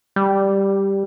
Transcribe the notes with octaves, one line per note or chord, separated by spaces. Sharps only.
G3